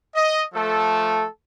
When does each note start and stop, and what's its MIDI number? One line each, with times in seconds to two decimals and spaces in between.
0.15 0.42 75
0.54 1.26 53
0.54 1.26 57
0.54 1.26 69